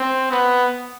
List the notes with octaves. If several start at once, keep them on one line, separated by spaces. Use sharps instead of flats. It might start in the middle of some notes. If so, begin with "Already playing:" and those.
Already playing: C4
B3